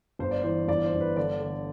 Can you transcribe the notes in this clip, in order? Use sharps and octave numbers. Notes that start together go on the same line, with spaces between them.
G1 C5
D5
E3 C5
G1 D5
C5
G1
B4
D3 D5
D3